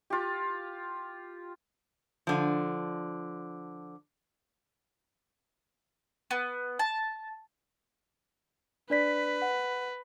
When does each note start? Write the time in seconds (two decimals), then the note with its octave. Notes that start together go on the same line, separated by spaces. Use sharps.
0.10 F4 G4
2.27 D3 F3
6.31 B3
6.79 A5
8.90 D4 B4 D5 B6
9.42 F#5